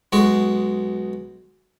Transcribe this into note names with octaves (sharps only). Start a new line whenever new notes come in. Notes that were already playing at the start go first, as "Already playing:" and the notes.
B1 G#3 F#4